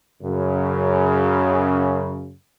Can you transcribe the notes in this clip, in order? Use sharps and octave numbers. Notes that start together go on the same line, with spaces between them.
F#2 C#3